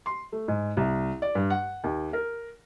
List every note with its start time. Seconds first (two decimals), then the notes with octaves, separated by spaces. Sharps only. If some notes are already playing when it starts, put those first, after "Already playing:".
0.06 C6
0.32 A3
0.48 G#2
0.77 C2
1.22 D5
1.35 G2
1.50 F#5
1.84 D#2
2.13 A#4